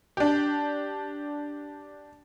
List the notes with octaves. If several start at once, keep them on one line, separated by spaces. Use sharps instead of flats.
D4 G4